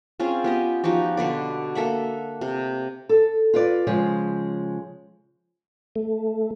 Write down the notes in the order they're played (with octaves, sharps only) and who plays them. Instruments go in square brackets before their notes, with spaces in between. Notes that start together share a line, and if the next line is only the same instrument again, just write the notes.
[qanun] C4 C#4 F4 G#4
B3 G4 D#5
F3 D#4 F#4 G4
B2 D3 B4 D5
A#3 A4 E5 F#5
C3
[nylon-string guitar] A4
F4 B4 D5
C#3 F3 G#3
[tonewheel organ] A3